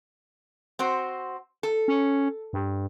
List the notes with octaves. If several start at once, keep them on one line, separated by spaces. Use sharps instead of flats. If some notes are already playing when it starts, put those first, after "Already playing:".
C4 F#4 C5
A4
C#4
G2